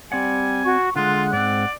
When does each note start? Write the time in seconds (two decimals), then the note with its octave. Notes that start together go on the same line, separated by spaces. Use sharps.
0.12 G3 C4 D5 F#5 G#5
0.65 F#4 C#6
0.96 D3 G#3 F4 F#5 F#6
1.33 G#2 C4 D5